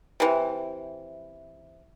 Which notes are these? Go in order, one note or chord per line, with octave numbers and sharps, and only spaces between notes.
C3 E3